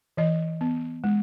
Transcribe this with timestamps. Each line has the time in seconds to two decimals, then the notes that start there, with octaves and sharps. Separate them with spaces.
0.17 E3 D#5
0.61 B3
1.04 G#3